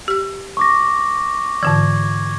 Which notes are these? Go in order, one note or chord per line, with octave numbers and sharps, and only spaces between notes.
G4 F6
C#6 D6 A#6
G#2 D3 E3 G#6